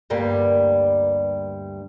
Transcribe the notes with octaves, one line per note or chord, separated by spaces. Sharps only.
D2 G2 G3 A#3 B3